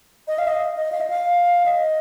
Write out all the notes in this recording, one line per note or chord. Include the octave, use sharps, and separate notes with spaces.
D#5
F5
D#5
D#5
F5
D#5
F5
D#5